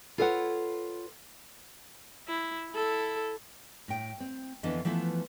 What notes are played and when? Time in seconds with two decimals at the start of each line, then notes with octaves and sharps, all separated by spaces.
0.18 F4 A4 B4 C#5 D#5 F#5
2.28 E4
2.71 E4 A4
3.88 A2 G5
4.20 C4
4.63 F2 D3 E3 B3 D4 D#5
4.85 E3 F3 A3 B3 E4